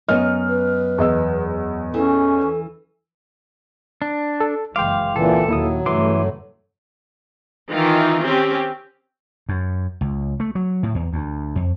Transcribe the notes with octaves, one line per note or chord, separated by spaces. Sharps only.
F#2 B3 D#5 F6
B4
E2 D#5 E6
E3 C#4 A4
D4
A4
F#1 E3 G#3 F5 G5 C6 D6
C#2 A#2 D3 E3 C4 A4
D#2 A#2 D#3 F#3 A#3 E4 D#6
G2 C#3 E3 A3 C6 D6
D#3 E3 D#4 F4
C4 C#4 G4
F#2
C#2
A3
F#3
A2
E2
D2
F2